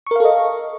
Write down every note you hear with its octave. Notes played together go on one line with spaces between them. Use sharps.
A4 A#4 D#5 F5 C#6